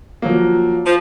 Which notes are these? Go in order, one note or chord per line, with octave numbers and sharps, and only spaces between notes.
F3 F#3 A#3
F3